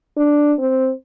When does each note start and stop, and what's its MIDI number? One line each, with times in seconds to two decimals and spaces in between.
0.17 0.53 62
0.59 0.91 60